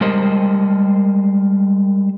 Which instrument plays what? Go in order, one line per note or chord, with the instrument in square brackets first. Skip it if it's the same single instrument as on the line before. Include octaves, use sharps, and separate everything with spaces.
[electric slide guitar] G3 G#3 A#4 C5 D#5